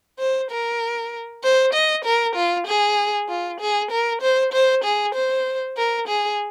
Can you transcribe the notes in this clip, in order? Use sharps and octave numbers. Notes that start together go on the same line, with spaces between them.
C5
A#4
C5
D#5
A#4
F4
G#4
F4
G#4
A#4
C5
C5
G#4
C5
A#4
G#4